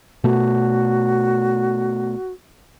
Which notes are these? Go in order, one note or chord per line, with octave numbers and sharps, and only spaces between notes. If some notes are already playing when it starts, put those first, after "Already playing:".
B2 A3 F#4